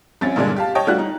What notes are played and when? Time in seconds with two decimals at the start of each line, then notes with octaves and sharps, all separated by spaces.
0.21 A#1 C4 C#4 A6
0.36 G2 A#2 D3 G#3 D4
0.56 G4 F5 A5
0.75 C#5 D#5 G5 A5
0.87 G3 A3 D4 F4 F#4 F#6
0.98 D#4